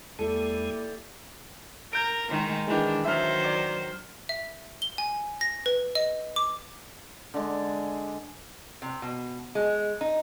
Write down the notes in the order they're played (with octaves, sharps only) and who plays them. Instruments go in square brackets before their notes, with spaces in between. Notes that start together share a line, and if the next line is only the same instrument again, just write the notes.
[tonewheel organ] E2 G#3 [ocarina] A#3 [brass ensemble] E4 G4 D5 [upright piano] A4
[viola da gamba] A#4 [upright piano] G6 D7
[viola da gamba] D#3 G#3
[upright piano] D#3 G#3 [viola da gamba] E3 D4
[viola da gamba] D#3 F#3 C5 [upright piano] E5 F6
[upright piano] D5
[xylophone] E5
G7
G#5
A#6
B4
D#5
D6
[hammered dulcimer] D3 G#3
[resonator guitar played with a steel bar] C3
B2
G#3
D#4